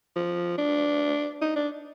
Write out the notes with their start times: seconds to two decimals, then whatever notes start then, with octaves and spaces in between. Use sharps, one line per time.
0.16 F3
0.58 D4
1.42 D#4
1.56 D4